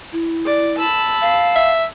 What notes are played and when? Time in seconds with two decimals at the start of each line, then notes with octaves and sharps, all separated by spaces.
0.12 E4
0.46 D5
0.79 A5 B5 E6
1.21 F5
1.56 E5